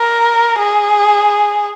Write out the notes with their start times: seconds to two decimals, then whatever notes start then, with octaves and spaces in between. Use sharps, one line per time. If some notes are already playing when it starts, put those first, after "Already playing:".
Already playing: A#4
0.59 G#4